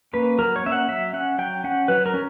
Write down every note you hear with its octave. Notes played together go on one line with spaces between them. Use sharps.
A#3 C#4 B4
F#3 A#4
C#5
A#3 C#4 E5
F#5
F#3 E5
C#4 F#5
F#3 G5
C#4 F#5
F#3 B4
A#4
C#4